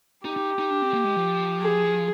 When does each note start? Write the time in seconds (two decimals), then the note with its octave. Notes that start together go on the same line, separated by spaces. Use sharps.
0.25 D#4 G4
0.36 D#4
0.59 D#4
0.70 D4
0.82 C4
0.93 A#3
1.04 G#3
1.16 F3
1.61 G#4